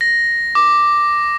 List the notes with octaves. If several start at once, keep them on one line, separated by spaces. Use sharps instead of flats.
A#6
D6